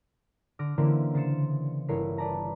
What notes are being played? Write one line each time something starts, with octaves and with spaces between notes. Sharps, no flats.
D3 D6 F6 A#6
D3 E3 A#3 C4 C#4 E4
C#3 C5 A6 C7 C#7 E7
G1 E4 A#4 C#5 C7
B4 D5 A5 A#5